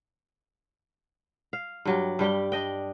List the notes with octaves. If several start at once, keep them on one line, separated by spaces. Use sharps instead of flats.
F5
G2 F#3 G4
G2 G3 G4 G5
D4 D#5 G5